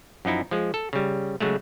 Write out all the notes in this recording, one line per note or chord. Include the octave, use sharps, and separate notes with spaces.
F#2 F3 D#4 E4
F3 G#3
A4
C#3 G3
C#3 F#3 G#3 A3